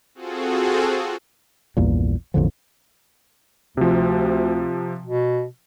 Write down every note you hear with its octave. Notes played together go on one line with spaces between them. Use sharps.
C4 F4 F#4 G#4 A4
A#1 E2 G2 A#2
A1 E2 D3 F3
D2 C3 F3
B2